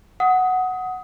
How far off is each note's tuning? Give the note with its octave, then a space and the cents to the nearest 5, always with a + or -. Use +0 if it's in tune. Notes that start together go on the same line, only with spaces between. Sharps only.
F#5 +0 D#6 +20